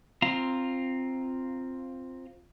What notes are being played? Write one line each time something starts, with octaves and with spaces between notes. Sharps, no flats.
C4 F4 F5 A#5